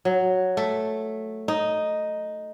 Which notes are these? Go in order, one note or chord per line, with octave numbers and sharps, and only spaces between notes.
F#3
A3
D#4